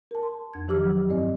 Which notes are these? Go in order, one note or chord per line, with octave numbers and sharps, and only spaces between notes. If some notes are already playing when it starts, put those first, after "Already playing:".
A#4 A5
C6
F2 G#6
D#3 F3 G4 D6 E6 F6
F#3
G2 C4 D5 D#5